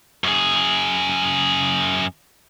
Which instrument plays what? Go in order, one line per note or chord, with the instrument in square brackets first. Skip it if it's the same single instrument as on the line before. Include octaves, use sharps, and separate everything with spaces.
[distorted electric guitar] F#2 G#4